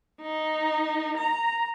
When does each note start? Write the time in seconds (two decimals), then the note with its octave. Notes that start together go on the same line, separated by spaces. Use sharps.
0.21 D#4
1.17 A#5